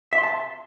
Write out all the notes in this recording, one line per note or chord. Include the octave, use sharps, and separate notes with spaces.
E5
C6
A5